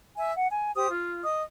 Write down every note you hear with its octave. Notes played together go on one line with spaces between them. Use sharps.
E5 G#5
F#5
G#5
G4 C5 D#6
F4
D#5 D#6